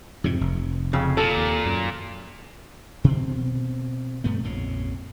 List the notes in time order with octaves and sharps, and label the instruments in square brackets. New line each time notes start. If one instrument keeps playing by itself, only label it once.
[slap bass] F2 G#2 C3
F1
[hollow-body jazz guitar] F2 C#3
[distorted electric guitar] A#2 [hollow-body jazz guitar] A4
[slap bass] D#2
F#2
B2 C4
G2 A3 B3
A#1 F2 C#3